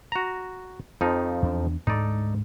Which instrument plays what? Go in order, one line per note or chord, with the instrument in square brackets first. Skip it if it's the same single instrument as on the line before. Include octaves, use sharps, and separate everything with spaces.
[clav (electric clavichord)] F#4 A#5
F2 F3 D#4
[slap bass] E2 D4
[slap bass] D2 G#2 [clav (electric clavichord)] D#4 A4 D5